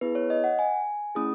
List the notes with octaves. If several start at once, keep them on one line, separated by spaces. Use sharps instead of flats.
B3 E4 G#4 B4
C#5
D#5
F#5
G#5
A3 C#4 E4 G#4 D#6